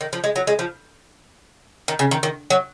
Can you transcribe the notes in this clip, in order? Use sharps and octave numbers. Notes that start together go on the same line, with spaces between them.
D#3
F3
G#3
F#3
G#3
F3
D#3
C#3
D#3
D#3
F#3